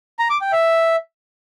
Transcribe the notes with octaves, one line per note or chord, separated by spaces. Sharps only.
A#5
D6
G5
E5